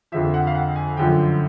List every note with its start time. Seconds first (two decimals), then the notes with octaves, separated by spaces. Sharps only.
0.12 F2 D3 F3 E5
0.34 F#5
0.47 F5
0.55 F#5
0.76 G#5
0.97 F#2 D3 F3 G5